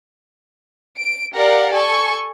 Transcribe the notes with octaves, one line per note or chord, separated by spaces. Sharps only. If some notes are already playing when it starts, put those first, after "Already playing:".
D7
G4 A#4 D5 F5 F#5
A4 G#5 C#6